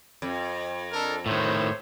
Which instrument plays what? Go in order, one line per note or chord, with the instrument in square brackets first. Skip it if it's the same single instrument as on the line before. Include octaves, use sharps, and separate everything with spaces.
[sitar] F2
[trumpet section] D4 A4 A#4
[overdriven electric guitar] A2 D#3 [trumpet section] C5 C#5 E5